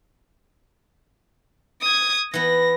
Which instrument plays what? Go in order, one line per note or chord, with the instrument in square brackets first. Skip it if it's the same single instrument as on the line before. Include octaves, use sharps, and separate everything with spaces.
[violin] D#6 G#6
[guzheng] E3 B3 [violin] A#6